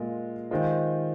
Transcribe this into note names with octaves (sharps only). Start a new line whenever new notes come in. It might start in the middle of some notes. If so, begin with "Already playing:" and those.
Already playing: A#2 G#3 F4 A#4
D#3 G#3 F4 C5